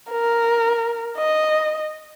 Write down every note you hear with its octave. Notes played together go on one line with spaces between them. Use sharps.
A#4
D#5